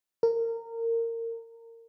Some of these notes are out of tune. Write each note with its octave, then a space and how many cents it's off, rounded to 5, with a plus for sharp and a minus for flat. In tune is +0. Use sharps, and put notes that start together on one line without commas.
A#4 -25